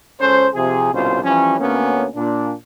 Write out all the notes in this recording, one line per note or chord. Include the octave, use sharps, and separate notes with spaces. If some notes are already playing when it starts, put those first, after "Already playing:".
C#2 C#4 A4 C5
C3 F3 G#4
C2 B2 D3 C#4 F4 C5
E3 F3 G3 C#4
D2 A#3 B3 C#4
A#2 D4